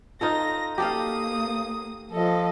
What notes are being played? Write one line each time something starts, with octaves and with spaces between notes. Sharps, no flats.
D#4 F4 A4 A#6
A#3 G4 A4 F5 D#6
F3 A4 D#5